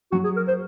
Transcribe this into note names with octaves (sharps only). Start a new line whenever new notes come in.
F#3 F#4
G#4
A#4
C5